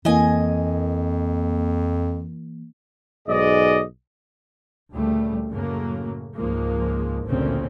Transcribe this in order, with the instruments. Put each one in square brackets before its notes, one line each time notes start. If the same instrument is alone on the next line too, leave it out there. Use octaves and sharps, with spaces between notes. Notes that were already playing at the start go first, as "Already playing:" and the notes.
[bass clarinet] F2 [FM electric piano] E3 A#3 [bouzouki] D#5 G#5
[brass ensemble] B1 G#2 G#3 D5 D#5
[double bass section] D2 A#2 C#3 G3 A3
F#2 A2 C#3 F#3 A3 A#3
C#2 G#2 F3 G#3 A#3
A1 D2 A#2 C#3 C4 C#4